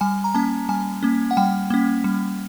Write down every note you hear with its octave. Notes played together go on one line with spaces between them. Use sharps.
G3 G#5
A#5
A#3 C#4 A5
G3 G#5
A#3 C#4
F#5
G3 G5
A#3 C#4
G3